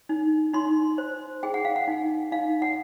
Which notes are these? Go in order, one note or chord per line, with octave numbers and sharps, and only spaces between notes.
D#4
D#4 C6
C5
G#4 G5
F#5
F5
F#5
D#4
D#4 F5
F#5